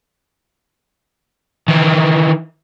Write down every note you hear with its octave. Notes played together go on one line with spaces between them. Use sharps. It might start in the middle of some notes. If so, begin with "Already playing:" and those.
D#3 E3